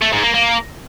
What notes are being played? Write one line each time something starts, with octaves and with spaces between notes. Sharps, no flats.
A3
G#2
A#3
A#3